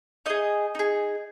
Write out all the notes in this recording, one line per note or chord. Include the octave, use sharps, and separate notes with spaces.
D#4 G#4 D#5
D#4 G#4